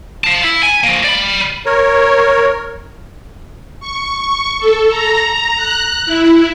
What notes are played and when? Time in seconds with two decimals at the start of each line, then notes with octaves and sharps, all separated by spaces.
0.24 F5 A5
0.43 E4
0.63 G#5
0.84 F3 A#3
1.04 D5 B5
1.66 A#4 C#5
3.80 C#6
4.59 A4
4.90 A#5
5.57 F#6
6.06 E4